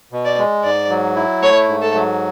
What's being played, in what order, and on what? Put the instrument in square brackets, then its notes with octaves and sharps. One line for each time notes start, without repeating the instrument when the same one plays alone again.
[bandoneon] B2
[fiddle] D5
[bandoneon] G#3
[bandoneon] G#2 [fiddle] D5
[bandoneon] F#3
E4
[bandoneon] A3 [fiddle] C#5
[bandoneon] G#2
[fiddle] A4
[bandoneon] F#3